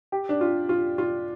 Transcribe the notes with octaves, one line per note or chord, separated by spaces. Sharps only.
G4
D4
F4
F4
F4